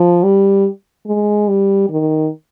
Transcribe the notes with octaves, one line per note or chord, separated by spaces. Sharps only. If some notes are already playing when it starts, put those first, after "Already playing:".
Already playing: F3
G3
G#3
G3
D#3